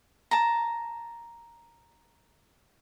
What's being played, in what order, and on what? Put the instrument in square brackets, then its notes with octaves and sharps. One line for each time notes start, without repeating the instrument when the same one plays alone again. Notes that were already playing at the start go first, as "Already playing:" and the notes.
[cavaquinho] A5 A#5